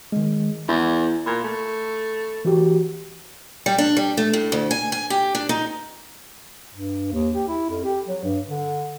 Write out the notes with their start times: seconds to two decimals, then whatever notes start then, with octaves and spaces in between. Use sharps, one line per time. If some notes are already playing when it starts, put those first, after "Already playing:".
0.12 D#3 G#3
0.69 E2 E4
1.26 A#2 B5 G#6
1.44 A3
2.45 E3 F#4 G4
3.66 G3
3.78 D4
3.97 G3
4.17 A3
4.33 A2
4.52 D2
4.71 G#5
4.92 G#5
5.10 G4
5.35 D4
5.49 D#4
6.74 G2
7.12 D#2
7.34 G4
7.48 E4
7.70 F2
7.84 G4
8.08 F#3
8.24 G2
8.47 D3